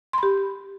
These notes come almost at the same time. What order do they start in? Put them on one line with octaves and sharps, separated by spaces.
C6 B5 G4